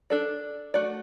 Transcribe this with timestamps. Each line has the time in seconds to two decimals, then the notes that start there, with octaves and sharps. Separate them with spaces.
0.10 D4 A4 D5
0.74 A3 F#4 D5